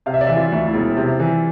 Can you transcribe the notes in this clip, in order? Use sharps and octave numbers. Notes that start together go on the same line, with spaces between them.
C3 F5
E5
D5
E3 E5
F4
D2
E4
E1
C3
E3